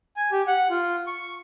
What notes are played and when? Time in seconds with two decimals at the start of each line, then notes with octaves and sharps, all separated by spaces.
0.16 G#5
0.32 G4
0.47 F#5
0.70 F4
1.07 C#6